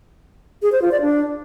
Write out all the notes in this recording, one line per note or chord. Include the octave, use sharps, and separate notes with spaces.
G#4
C5
F4
D5
D4